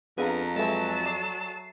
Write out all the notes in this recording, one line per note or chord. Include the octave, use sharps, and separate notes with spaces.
F2 B3 D4 G#4 B4 F5 A#5
F#3 G#3 A4 B4 E5 G#5 A5
D5 C7